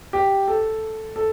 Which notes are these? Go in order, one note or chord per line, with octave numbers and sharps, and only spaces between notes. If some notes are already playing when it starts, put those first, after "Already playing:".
G4
A4
A4